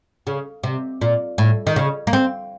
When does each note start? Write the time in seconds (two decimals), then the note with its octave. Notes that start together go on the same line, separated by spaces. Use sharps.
0.27 C#3
0.63 C3
1.01 A#2
1.38 A2
1.67 D#3
1.76 C#3
2.07 A#3
2.13 C4